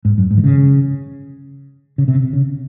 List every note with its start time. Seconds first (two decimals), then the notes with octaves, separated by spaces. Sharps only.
0.05 G#2
0.18 F#2
0.31 G#2
0.37 D#3
0.44 C#3
1.98 C#3
2.08 C3
2.33 C#3